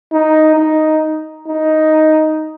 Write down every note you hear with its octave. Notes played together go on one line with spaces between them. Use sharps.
D#4
D#4
D#4